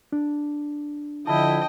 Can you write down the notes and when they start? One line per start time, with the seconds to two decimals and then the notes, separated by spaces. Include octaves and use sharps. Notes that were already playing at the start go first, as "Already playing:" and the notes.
0.12 D4
1.27 D3 F3 E4 D#5 G5 A5